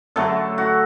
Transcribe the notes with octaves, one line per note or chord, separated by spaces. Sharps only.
D3 F#3 A3 A4
F#4